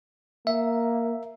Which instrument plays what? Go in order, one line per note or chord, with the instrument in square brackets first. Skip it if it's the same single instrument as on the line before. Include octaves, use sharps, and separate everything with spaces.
[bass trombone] A#3 [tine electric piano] E5